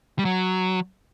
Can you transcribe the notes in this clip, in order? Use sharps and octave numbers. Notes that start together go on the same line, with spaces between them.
G3
F#3